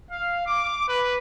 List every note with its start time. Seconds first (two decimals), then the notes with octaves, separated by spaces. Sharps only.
0.10 F5
0.47 D6
0.89 B4